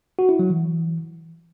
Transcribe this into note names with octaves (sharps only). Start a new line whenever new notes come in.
F#4
E4
F#3
E3